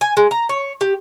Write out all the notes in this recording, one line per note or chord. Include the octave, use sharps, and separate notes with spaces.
G#5
G#3
A#5
C#5
G4